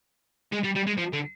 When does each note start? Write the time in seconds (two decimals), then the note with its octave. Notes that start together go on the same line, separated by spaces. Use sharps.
0.52 G#3
0.63 G3
0.75 G3
0.87 G#3
0.98 F3
1.13 D3